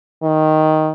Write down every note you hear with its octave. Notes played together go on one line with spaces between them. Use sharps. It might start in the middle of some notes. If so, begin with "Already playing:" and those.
D#3